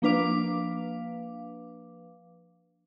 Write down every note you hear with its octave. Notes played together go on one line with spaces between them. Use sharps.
F3 A#3 D4 B4 F5 D6